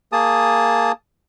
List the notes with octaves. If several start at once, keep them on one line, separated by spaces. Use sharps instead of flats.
A#3 G#4 A5 D#6